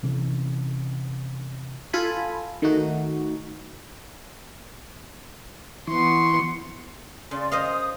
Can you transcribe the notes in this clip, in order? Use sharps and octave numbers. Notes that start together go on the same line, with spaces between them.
C3 E3 C#4
F4 A4 G#5 B5
D#3 A3 D#4 F#4
E3 B3 C6 C#6
C#3 D5 C6
C5 D#5 F5 D#6